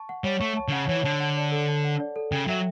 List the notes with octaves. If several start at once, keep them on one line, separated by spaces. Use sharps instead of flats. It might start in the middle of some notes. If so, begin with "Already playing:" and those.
Already playing: A5 C#6
F#5
G3 C#5
A3 C#6
A5
D3
C#3 F#5
E3 C#5
D3 A5
F#5
D5
A4
A5
F#5
D5
A4
C#3 G5
F#3 E5